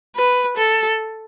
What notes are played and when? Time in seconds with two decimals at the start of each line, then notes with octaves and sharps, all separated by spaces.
0.16 B4
0.57 A4